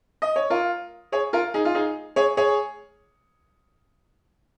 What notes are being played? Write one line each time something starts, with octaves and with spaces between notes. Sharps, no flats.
D#5
C#5
F4 A#4
G#4 C#5
F4 A#4
D#4 G#4
F4
D#4 G#4
G#4 C#5
G#4 C#5